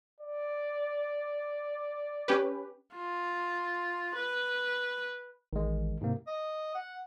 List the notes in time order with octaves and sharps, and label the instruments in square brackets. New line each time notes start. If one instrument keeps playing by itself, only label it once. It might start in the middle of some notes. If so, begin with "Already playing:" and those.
[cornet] D5
[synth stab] C#4 G4 B4
[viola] F4
B4
[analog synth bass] A1 [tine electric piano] D#3 G#3
[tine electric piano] G#2 C3 A#3
[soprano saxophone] D#5
F#5